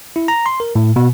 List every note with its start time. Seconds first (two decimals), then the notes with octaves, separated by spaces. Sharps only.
0.16 E4
0.28 A#5
0.46 C6
0.60 A#4
0.76 A2
0.96 B2